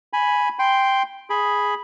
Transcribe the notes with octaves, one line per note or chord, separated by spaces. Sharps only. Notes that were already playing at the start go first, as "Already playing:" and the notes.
G#5 B5
G5 C6
G#4 B5